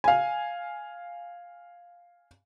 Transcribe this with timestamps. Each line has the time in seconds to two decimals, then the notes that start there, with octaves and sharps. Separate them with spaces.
0.04 F5 G#5